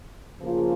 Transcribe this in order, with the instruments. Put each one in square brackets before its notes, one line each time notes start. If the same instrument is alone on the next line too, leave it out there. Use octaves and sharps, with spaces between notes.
[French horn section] C#3 F3 A#3 F4 G#4